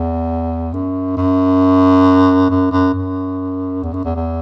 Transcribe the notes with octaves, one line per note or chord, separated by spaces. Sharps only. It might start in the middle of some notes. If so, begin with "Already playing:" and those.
Already playing: E2
F#2
F#2
F#2
F#2
F#2
E2
F#2
E2
E2